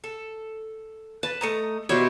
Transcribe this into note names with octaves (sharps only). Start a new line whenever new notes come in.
A4
B4 A5
A3 D#5 A#5
B2 G3 E4 F#4 C5 C#5